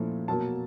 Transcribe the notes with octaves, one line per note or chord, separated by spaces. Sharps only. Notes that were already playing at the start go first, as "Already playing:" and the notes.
Already playing: A#2 F3 A3 C#4 E4
B2 F#3 A#3 A5